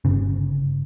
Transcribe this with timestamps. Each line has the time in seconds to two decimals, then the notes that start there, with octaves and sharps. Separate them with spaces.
0.05 G1 C#3